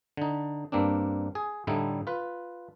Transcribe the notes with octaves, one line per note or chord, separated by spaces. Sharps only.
D3 D#4
G2 A#3 C4 D4
G#4
A2 D3 G3 A3 D#4 E4
F4 B4